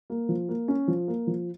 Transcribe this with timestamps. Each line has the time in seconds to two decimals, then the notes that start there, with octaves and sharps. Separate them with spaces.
0.10 A#3
0.29 F3
0.49 A#3
0.68 C#4
0.88 F3
1.08 A#3
1.27 F3